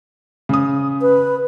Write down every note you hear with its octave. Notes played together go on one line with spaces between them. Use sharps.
C#3 D#6
B4